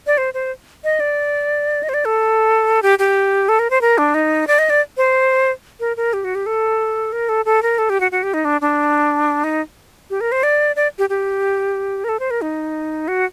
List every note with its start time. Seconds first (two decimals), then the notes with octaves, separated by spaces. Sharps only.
0.07 D5
0.18 C5
0.34 C5
0.84 D#5
1.00 D5
1.83 D#5
1.89 C5
1.94 D5
2.05 A4
2.82 G4
2.99 G4
3.49 A4
3.59 A#4
3.70 C5
3.81 A#4
3.98 D4
4.14 D#4
4.47 D5
4.59 D#5
4.70 D5
4.97 C5
5.80 A#4
5.97 A#4
6.13 G4
6.24 F#4
6.35 G4
6.46 A4
7.12 A#4
7.29 A4
7.45 A4
7.63 A#4
7.78 A4
7.90 G4
8.00 F#4
8.12 F#4
8.23 G4
8.34 D#4
8.45 D4
8.61 D4
9.44 D#4
10.10 G4
10.21 A#4
10.32 C5
10.43 D5
10.76 D5
10.99 G4
11.09 G4
12.04 A#4
12.09 A4
12.20 C5
12.31 A#4
12.42 D#4
13.08 F#4